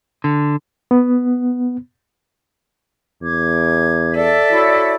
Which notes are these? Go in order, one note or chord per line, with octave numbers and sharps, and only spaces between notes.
D3
B3
E2 D6 G#6
A4 D5 E5
E4 F#4 C#5